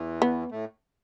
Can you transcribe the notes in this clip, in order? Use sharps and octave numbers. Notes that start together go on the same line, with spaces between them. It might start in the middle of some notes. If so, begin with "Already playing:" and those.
Already playing: E2 E3
B3
A2 A3